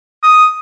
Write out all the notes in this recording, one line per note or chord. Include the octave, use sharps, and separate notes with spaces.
D#6